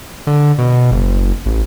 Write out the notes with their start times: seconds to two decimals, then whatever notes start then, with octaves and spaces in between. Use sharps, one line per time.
0.27 D3
0.58 B2
0.91 F#1
1.46 A1